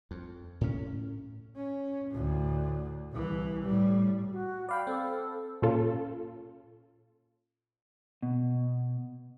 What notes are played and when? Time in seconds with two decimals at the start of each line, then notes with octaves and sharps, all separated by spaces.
0.11 F2
0.61 A2 C#4
1.56 C#4
2.10 D2 A2
3.12 C2 E3
3.65 A2 G3
4.31 F#4
4.69 D5 F5 G5 B5
4.87 C4 A4
5.62 A#2 C#4 F4 A4
8.23 B2